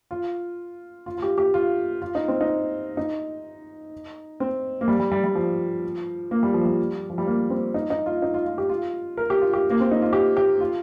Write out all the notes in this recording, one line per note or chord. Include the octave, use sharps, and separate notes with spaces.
F4
F4
F4
G4
G4
F4
F4
D#4
C4
D#4
D#4
C4
A#3
G3
G3
G3
G3
F3
A#3
G3
F3
G3
F3
G3
A#3
C4
D#4
D#4
F4
D#4
F4
F4
G4
F4
A#4
G4
F4
G4
A#3
C4
D#4
F4
G4
G4
F4